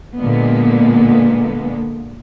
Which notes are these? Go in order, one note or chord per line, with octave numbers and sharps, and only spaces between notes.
A#2 D3 G#3 A#3 B3